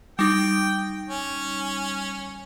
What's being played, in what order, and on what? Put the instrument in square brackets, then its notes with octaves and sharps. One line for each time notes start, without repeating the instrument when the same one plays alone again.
[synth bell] G3 D#4 [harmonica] G5
[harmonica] C#4